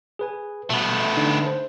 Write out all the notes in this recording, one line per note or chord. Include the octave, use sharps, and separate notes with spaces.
G#4 B4 G#5
B2 A3 B3
D3 D4 D#4
C5